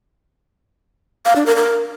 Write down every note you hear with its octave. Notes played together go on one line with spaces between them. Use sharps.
F5
D4
A#4
A#4